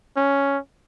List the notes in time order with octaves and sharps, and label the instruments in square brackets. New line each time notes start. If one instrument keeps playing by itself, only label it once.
[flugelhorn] C#4